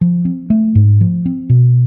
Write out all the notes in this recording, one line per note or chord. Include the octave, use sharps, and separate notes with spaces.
F3
C4
A3
G#2
F3
C4
B2